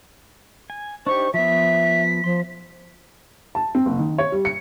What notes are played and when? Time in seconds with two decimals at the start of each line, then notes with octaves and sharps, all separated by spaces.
0.70 G#5
1.07 D4 D#4 G4 C5 C#6
1.34 F3 B3 E5 B6
2.24 F3 C6
3.55 A5
3.75 C4
3.86 F#1
3.99 D#3
4.18 C#5
4.32 G3
4.45 C#7